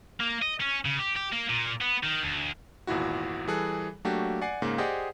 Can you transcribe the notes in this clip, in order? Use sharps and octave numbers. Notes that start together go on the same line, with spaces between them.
A#3
D#5
C#4
C#3
G4
G4
A#3
A#2
B3
D#3
D2
G#1 E2 A#2 E4 F#4
E3 G3 G#4 A4 F#6
F#3 A3 A#3 D4 F#4 G4
D5 F#5 G#5 D6 C7
G#2 C#3 A#3
G4 G#4 C5 D5 D#5 F#5